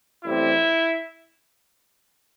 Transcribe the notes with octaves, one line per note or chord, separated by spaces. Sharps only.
A1 A2 G3 C4 E4